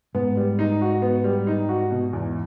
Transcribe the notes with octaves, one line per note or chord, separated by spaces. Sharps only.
G#2 B3
G3
D#4
F#4
B3
G3
D#4
F#4
B2
E2